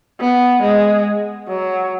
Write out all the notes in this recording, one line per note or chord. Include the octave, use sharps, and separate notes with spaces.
B3
G#3
F#3